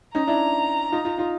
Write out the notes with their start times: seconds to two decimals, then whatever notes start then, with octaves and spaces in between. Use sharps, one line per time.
0.15 C#4 D#4 A#5
0.27 D4 E4
0.92 D#4 F4
1.05 D#4 F4
1.18 D#4 F4